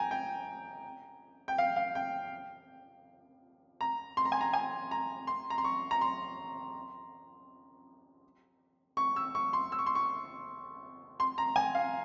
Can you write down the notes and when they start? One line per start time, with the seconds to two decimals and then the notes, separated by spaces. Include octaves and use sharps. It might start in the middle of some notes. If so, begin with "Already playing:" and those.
Already playing: G5 G#5 A#5
0.11 G5
1.48 G5
1.58 F5
1.76 F5
1.95 G5
3.81 A#5
4.17 C6
4.25 A#5
4.32 G#5
4.41 A#5
4.53 G#5
4.91 A#5
5.27 C6
5.50 A#5
5.58 C6
5.64 C#6
5.91 A#5
6.01 C6
8.97 C#6
9.16 E6
9.35 C#6
9.53 C6
9.72 E6
9.79 C#6
9.86 C6
9.95 C#6
11.20 C6
11.38 A#5
11.56 G#5
11.75 F5